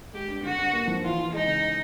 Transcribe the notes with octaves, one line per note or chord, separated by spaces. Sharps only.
G#3 G4
G2
D3 F#4
G2
A#3
F3
E3 F4
E3
G#3 D#4
C#3